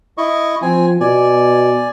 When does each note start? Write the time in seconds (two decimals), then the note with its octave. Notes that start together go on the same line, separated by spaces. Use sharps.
0.18 E4 D#5 C#6
0.62 F3 C4 G#5
1.00 B2 D5 G#5